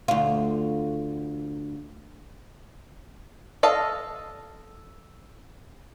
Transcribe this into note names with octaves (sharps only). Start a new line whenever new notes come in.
D2 F4
A4 D#5 F5